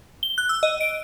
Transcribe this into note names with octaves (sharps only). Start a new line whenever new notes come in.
G7
F#6
E6
D#5
D7